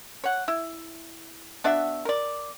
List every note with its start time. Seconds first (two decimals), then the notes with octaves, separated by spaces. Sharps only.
0.24 C#5 F#5
0.48 E4
1.64 B3 D4 F#4 E5
2.05 A#4 D5